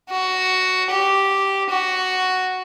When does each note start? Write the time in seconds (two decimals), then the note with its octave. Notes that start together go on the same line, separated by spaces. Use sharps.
0.11 F#4
0.91 G4
1.71 F#4